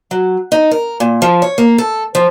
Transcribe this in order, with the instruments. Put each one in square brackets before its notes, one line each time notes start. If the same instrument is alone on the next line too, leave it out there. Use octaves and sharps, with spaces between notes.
[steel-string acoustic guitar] F#3
D#4
A#4
A#2
F3
C#5
A#3
A4
F3